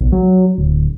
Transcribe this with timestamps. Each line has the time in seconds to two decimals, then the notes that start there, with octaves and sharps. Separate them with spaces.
0.01 B1
0.12 F#3
0.58 D1